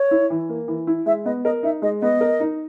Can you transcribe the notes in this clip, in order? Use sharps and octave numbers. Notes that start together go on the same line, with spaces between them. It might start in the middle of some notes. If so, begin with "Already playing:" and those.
Already playing: C#5
E4
E3
A#3
E3
E4
G#3 E5
B3 D#5
A#4 D#5
D#4 E5
G#3 D#5
B3 D#5
A#4
D#4